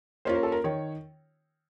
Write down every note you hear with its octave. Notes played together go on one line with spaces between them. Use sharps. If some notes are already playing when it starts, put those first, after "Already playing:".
A#3 C#4 F4 C5
A#4
A4
A#4
D#3 C#5